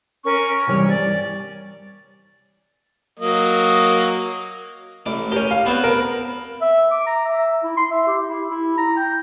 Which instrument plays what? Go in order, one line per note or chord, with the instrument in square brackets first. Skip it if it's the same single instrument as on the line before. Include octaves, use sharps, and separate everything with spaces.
[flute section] C#4 A#4 C#6
[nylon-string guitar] C3 E3 G3 [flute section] C#5
[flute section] D5 [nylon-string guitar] G#5
[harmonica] F#3 A#3 D#5
[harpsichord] A1 D6
[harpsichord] C#4 G4 [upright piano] A#4
[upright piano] F5
[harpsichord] B3 C4 B4
[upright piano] A#4
[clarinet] E5
D6
A#5
E5
E4
C6
E5
G4
E4
E4
A#5
G5